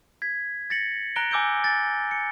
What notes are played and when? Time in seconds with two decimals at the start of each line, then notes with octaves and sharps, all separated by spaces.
0.22 G#6 B6
0.70 A6 A#6 C#7 F#7
1.16 A#5 F#6 A#6 D7 G7
1.31 G#5 D6 E6 G6 D7 G7
1.64 A6
2.11 C#7